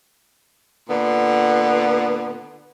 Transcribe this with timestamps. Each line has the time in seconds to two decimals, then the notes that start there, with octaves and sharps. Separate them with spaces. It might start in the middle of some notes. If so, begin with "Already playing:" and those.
0.90 A#2 D3 B3